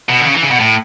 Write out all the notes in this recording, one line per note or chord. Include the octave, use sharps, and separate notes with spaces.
B2
D3
C#3
E3
C#3
B2
A2